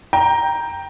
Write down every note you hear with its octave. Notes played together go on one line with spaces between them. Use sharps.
G5 A#5